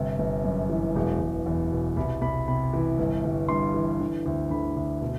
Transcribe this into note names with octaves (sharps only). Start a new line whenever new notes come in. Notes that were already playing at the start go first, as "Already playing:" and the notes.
Already playing: G1 C3
G1
F#2
E3
E1
E1
E2
B2
C2 B5
C2 B5
C3 B5
E3
G1
G1
G2 C6
E3
D3
D2
D3 B5
D2
B2